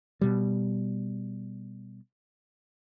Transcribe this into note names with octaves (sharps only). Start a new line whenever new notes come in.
B2 G3